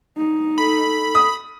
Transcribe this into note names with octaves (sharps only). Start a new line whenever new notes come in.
D#4
A4 B5
D#6